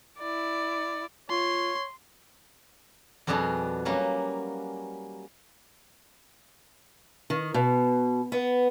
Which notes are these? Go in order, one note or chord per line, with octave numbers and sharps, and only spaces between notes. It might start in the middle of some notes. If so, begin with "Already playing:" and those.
E4 D5
F4 C#5 C6
F2 B2 G3 D4 G#4 C6
F#3 G3 A#3 C#4
D#3
B2
B3